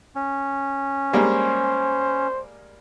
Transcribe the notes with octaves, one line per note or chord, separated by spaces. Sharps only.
C#4
G3 G#3 A#3 C5